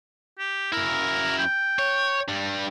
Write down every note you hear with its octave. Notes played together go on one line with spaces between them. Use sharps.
G4
F#2 E4 A#4
G5
C#5
G2 G3